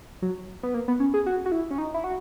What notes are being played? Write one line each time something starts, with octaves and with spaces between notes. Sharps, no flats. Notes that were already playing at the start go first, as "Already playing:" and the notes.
F#3
B3
A#3
B3
C#4
G#4
F#4
F#4
E4
C#4
D#4
E4
F#4